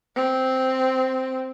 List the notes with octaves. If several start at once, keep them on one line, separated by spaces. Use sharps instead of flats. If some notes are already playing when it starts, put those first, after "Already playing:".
C4